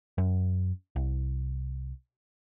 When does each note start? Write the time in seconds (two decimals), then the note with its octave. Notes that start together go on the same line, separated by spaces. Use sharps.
0.18 F#2
0.96 C2